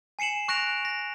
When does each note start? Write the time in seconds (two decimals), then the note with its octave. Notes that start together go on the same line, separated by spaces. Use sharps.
0.19 G#5 C7 C#7 E7 F#7
0.48 C#6 F#6 A#6 D7 F7
0.85 A#6